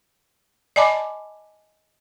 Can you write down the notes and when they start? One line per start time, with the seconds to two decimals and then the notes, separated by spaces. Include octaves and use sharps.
0.76 D5 D#5 G#5 A5 B5 D6